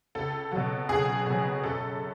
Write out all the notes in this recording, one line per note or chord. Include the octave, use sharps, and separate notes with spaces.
C#2 A4
B2 F#3 F#4
C#2 G#4
B2 F#3
F#2 A4